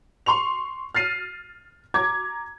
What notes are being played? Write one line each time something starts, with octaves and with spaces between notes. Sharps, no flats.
C6 C#6 F7
F6 A6 C7 D#7
A#5 D6 G#6